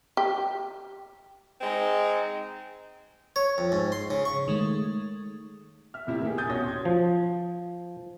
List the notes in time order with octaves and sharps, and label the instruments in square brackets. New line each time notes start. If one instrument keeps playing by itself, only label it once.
[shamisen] G4
[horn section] G#3 C4 D#4
[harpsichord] C#5
F2
G#2
C6
C#3
C#6
[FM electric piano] D#3 G#3 A3
[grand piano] E5 F6
A2 C3 E4 G4
D#3 A#3 B3 E4 G4 G#4
G#5 D#6 G6 A6
B2 C#4 F#4 C#5 D#6 A#6
C6 G#6
[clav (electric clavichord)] F3